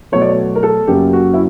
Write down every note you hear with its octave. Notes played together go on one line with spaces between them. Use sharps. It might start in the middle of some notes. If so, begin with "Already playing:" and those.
B2 F#3 A3 C#5
D5
C#5
A#4
A4
F#2 C#3 F#3 A#3 C#4 G4
F#4
E4